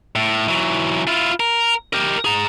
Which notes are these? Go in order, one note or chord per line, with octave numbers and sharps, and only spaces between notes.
A2
E3 F#3
E4 F4
A#4
G4 A#4
G#4 A#5